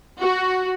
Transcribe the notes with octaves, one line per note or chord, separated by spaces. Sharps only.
F#4